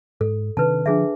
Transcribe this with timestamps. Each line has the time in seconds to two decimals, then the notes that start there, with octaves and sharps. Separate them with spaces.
0.21 G#2 A4
0.57 C3 D#3 D4 B4 A5
0.86 D3 F3 D4 G#4 E5